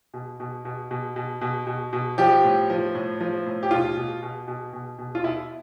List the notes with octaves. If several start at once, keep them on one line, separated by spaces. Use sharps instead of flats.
B2
B2
B2
B2
B2
B2
B2
B2
F3 G4
A2
F3
A2
F3
A2
G4
B2 F4
B2
B2
B2
B2
B2
F4
B2 E4